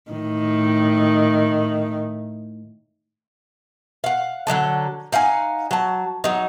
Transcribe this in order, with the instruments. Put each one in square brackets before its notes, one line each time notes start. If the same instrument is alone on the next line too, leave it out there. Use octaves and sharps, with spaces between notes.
[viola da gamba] A2 D#3
[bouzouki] F5 F#5
D3 F#3 D#4 A4
D#4 F5 F#5 G#5
F#3 A5
F#3 D#4